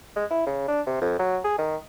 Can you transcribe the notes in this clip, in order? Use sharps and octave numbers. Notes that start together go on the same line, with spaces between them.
G#3
E4
C#3
D4
C3
F2
F#3
G#4
D#3